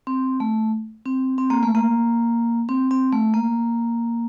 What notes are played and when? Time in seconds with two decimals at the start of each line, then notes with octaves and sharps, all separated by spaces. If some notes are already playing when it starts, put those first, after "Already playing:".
0.07 C4
0.40 A3
1.06 C4
1.38 C4
1.50 A#3
1.63 A3
1.75 A#3
2.69 C4
2.91 C4
3.13 A3
3.34 A#3